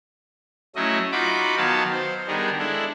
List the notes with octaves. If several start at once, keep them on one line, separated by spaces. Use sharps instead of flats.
F#3 A3 C#4 E4 D#5
D#4 F4 F#4 B5 D6
D#3 F#3 B3 C#5 F5 A5
C5
D#3 G3 B3 D4 G#4 A#4
G#3 D4 E4 A4